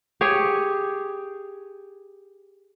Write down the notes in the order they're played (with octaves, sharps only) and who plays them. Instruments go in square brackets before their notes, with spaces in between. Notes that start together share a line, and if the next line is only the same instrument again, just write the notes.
[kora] G4 G#4 C#5